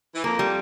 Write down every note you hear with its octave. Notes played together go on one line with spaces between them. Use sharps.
E3
F2 F3 A#3
G3